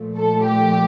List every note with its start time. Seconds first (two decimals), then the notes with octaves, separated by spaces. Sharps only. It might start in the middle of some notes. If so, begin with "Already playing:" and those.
Already playing: A#2 F3 A3
0.19 A4
0.48 G4